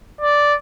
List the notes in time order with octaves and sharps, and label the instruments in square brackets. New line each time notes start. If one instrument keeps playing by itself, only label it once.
[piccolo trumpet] D5